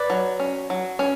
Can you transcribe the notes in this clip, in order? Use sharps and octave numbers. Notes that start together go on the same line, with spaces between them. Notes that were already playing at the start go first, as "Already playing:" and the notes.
Already playing: B4 D5
F#3
C#4
F#3
C#4